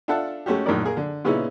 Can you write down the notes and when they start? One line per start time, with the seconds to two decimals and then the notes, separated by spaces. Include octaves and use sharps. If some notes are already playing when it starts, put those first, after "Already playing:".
0.08 D4 F4 A4 E5 F#5 A5
0.46 G#3 A3 C#4 F#4 G4
0.66 A#1 F#2 A2 D#3 A#4 D5
0.84 A#3 G#4 A#4
0.97 D3
1.25 A#2 C#3 B3 C#4 D#4 E4